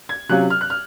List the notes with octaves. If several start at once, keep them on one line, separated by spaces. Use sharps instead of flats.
G#6
C3 F#3 C#4 F4 F#6
F6
F#6
F6